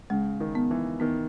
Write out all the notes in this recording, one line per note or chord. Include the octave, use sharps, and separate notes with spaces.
C#3 G#3
D#3
B3
E3
D#3 B3